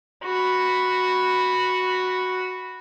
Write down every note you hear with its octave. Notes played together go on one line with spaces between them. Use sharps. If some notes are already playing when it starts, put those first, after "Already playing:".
F#4 B5